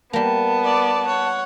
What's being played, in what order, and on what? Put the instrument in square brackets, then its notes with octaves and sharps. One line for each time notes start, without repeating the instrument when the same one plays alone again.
[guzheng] G3 A#3 [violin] B3 [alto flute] A5
[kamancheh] D5 D6
C#5 F#5